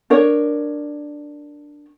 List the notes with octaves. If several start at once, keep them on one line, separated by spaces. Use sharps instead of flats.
D4 A#4 C#5